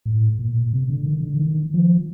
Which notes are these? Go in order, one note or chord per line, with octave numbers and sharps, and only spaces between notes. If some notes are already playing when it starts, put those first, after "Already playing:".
A2
A#2
C3
D3
D#3
D3
D#3
F3